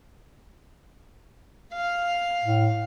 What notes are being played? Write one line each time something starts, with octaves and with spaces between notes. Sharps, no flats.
F5
A2